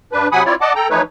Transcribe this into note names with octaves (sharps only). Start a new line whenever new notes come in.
G2 D4 B4
C3 F#3 F#5 G#5 B5 D#6
C4 E4 F4 C#5 D5
D5 D#5 F#5 A5 D6
A4 G5 A#5
E3 F3 A3 D#4 B4 C#5